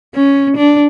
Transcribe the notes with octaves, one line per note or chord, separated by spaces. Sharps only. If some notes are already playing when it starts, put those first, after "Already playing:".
C#4
D4